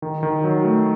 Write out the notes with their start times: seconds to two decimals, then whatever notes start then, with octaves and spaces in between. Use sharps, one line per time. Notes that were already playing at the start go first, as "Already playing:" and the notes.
0.02 D#3
0.23 D#3
0.44 F#3
0.64 A3